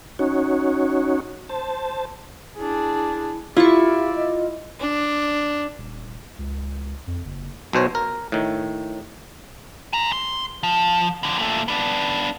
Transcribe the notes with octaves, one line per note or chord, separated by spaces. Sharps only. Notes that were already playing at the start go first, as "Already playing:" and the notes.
C#4 D#4 F#4 C#5
C5 A5
D4 E4 G#4
E4 F4 G4 D5 E5 C#6
D#5
D4
D#1
C#2
F2
F#1
B1 B2 C5 C#5
A#4
A2 D#3
G#5 A#5
C6
F3
F2 D3
A#2 A3
B3 D4